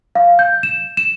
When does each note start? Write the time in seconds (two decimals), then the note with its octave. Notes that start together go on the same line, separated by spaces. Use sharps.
0.15 F5
0.39 G6
0.63 E7
0.97 E7